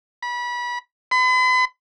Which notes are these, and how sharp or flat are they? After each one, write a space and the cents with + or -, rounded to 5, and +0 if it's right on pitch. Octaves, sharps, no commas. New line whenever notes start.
B5 -30
B5 +40